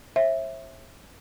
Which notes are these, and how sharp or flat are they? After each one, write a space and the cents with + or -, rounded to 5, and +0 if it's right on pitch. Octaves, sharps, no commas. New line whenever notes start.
C#5 -45 E5 +0